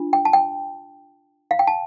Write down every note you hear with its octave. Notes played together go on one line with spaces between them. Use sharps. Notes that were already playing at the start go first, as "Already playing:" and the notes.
Already playing: D4 F4
G5
A5
G5
F5
G5
A5